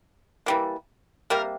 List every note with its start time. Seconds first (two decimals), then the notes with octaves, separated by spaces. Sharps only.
0.46 E3 G3 A#3
1.30 C3 G3 A#3 A#4